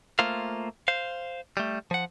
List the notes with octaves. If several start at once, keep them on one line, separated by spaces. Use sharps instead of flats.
A3 A#3 F4 C5 F5
C5 F5
G3 A3
F3 F#5